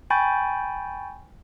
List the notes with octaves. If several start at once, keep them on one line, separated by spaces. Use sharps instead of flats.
G5 G#5 B5 C#6 G6 A6